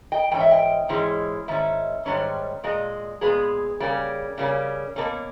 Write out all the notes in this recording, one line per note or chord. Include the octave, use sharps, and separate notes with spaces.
D#5 G5
G#2 E3 C#4 G5
E5
D#5 G5
G#2 E3 G#3 C#4
G#2 D#3 C#4 E5
G#2 D#3 G3 C#4
A#2 G#3 D#5
A#2 G#3 B3 G#4 B4
C#3 G3 A#3 C#4
C#3 G3 A#3 C#4
B2 A#3 C#4